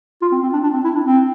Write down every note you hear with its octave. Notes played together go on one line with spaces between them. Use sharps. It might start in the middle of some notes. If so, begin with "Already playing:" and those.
F4
C4
C4
D4
D4
C4
E4
D4
C4